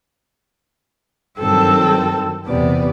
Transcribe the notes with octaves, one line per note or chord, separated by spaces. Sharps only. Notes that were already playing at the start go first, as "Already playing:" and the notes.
G2 D#3 F#3 C4 A4
E2 C3 B3 D5